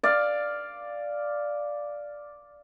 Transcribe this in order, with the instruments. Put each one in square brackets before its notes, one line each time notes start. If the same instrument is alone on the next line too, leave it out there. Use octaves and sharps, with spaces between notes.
[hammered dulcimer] D5 F5